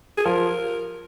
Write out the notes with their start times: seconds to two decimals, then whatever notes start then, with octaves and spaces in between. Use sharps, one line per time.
0.17 G#4
0.25 F3 A#4